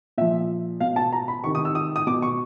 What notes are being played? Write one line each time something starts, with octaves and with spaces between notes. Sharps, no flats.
A#2 F3 E5
B2 F5
A5
A#5
B5
C3 D#3 C#6
D#6
E6
D#6
D#6
B2 D6
C#6